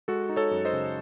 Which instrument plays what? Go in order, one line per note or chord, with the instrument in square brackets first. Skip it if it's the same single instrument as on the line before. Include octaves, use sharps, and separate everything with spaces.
[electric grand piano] G#3 F#4 A4
D#4
A4 C#5
F#2
C5 D#5
C#3